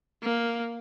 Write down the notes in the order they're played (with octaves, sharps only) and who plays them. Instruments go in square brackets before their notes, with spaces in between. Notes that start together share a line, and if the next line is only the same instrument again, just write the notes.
[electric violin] A#3